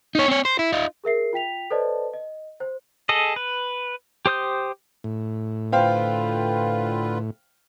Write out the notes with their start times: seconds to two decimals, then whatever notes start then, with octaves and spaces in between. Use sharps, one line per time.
0.15 D#4 C#5
0.28 C4 C#5
0.45 C5
0.59 E4
0.73 D#4 F4
1.04 G#4 A#4 E5 C7
1.33 F4 G5 B6 F7
1.70 A4 B4 C5 D5 D#5 A5
2.14 D#5
2.60 C5
3.09 G#4 A4 D#5
3.36 B4
4.26 G4 C5 D#6 G6
5.04 A2
5.72 D3 F4 B4 C5 F5 G5